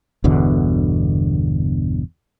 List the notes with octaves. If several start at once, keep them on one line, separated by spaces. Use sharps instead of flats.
G1 E2 B2 D3